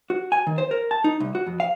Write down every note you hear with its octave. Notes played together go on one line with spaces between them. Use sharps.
F#4
G#5
D#3
C5
A#4
A5
D#4
C2
F#4
F2
F5